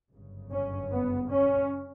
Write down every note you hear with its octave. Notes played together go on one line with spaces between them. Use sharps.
G1 F#2 C#3
C#4
B3
C#4